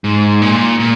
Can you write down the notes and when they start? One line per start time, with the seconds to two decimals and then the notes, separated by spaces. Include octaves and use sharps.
0.04 G#2
0.42 A#2
0.80 A#2